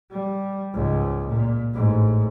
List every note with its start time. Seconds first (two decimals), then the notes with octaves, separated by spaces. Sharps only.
0.11 G3
0.74 C#2 G#2
1.27 A#2
1.74 A1 G#2